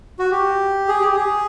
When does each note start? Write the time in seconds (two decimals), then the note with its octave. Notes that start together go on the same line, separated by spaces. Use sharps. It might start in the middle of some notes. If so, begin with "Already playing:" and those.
0.19 F#4
0.31 G4
0.88 G#4
1.01 G4
1.16 G#4